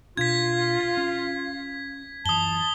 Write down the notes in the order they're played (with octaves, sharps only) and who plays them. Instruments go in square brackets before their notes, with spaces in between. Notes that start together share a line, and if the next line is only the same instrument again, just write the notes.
[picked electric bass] B2 D4 [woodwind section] F4 [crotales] G#6 B6
[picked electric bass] C#4
[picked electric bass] F#2 E3 [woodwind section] A5 [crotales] D#6 G7